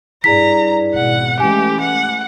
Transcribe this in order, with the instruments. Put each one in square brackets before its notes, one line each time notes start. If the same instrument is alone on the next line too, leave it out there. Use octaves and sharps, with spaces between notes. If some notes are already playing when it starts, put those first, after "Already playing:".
[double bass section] G2 [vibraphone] E4 G#4 D5 [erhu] A#5 [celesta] B6
[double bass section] G#1 B2 [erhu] F#5
[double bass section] E3 G#3 A3 [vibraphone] C#4 [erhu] G4 [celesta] G#5
[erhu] F#5